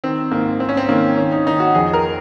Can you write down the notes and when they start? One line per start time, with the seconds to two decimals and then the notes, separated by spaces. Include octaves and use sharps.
0.04 D#3 C4
0.31 G#2 A#3
0.60 G#2 C4
0.69 C#4
0.77 C4
0.89 D#3 A#3
1.17 D#3 C#4
1.32 D#4
1.47 D#3 D#4
1.60 F#4
1.75 F2 G#4
1.93 A#4